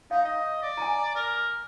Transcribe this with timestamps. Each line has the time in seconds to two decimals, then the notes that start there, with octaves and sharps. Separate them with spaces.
0.11 D#4 F5
0.25 D#5
0.63 D5
0.77 G#5 A#5
1.16 A#4